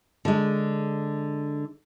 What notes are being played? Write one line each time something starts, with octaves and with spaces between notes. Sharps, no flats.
D3 G#3